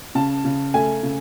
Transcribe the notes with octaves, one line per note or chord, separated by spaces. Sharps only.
C#3 A5
C#3
A3 G#5
C#3